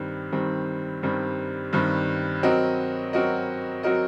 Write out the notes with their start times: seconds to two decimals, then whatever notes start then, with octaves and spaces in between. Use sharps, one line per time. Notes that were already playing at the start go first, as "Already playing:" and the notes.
Already playing: G2 D#3 G3 C4
0.32 G2 D#3 G3 C4
1.03 G2 D#3 G3 C4
1.73 G2 D#3 G3 C4
2.43 F#3 C4 F#4 A#4 D#5
3.13 F#3 C4 F#4 A#4 D#5
3.83 F#3 C4 F#4 A#4 D#5